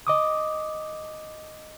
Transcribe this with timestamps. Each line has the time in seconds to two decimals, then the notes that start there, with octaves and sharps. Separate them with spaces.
0.07 D#5 D6 D#6